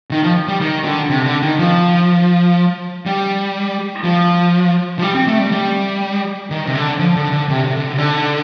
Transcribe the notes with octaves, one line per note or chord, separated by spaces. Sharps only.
D#3
F3
G3
D#3
D3
C3
D3
D#3
F3
G3
F3
F3
G3
C4
A3
G3
G3
D#3
C3
D3
F3
D3
D3
C3
C3
D3
C3
D3